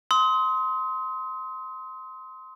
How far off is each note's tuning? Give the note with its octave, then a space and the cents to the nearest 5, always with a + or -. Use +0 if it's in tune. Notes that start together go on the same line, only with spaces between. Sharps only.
C6 -5 D#6 +40